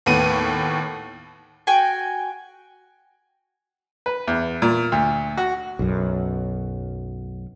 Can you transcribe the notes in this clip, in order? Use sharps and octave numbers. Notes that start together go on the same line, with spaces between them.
D#2 A2 B3 D#7
F#4 G5 G#5
B4
E2
A#2
D2
F#4
B1 F#2